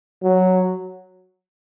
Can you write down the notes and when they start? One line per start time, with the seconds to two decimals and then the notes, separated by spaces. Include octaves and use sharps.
0.23 F#3